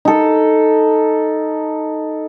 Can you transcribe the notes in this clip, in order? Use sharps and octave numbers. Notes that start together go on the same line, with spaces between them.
D#4 A4